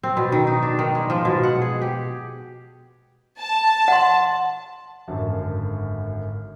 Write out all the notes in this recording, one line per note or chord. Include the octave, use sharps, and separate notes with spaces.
C4
B2
D#3
D#4
D4
D#3
G#3
F3
B2
F#5
G#4
G4
A5
F#5 C6
G#1 F#2 D3